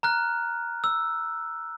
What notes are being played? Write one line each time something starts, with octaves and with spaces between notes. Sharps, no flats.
A#5 F6 F#6
E6